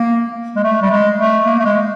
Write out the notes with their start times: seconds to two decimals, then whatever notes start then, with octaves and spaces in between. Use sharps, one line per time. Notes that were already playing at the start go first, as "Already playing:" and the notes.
Already playing: A#3
0.56 G#3
0.64 A3
0.82 G3
0.90 G#3
1.18 A3
1.45 A#3
1.59 A3
1.65 G#3